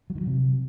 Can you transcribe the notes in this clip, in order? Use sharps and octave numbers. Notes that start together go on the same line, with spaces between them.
F#3
D#3
F#3
C3